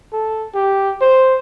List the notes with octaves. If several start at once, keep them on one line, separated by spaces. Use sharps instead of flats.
A4
G4
C5